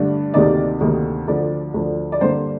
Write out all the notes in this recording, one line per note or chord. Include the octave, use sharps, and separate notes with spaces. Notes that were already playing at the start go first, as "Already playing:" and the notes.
Already playing: G2 D3 A3 D4
D2 C3 D#3 A#3 D#4 D5
D2 C3 D#3 A#3 D#4
D2 D3 F3 D5
D2 D3 F3
D5
G2 D3 G3 A#3 C5